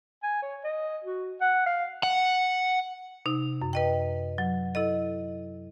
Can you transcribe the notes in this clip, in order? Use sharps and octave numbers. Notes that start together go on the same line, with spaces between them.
G#5
C#5
D#5
F#4
F#5
F5
F#5
C3 D#4
F#2
B4 D#5 G5
F#3
E4 A4 D#5